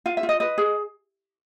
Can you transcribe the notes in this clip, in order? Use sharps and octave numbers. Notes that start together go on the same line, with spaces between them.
F4 F5
E5
F4
D#5
B4 D#5
G#4